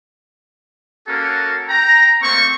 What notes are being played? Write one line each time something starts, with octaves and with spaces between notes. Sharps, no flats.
A#3 C#4 F#4 A4 A#4
G5 A#5
A3 A#3 C4 C#6